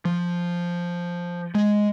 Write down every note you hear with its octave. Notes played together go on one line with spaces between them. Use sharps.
F3
G#3